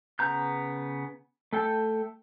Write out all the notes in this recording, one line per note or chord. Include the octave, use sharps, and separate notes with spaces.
C#3 B3 A#5 G6
A3 A4 G5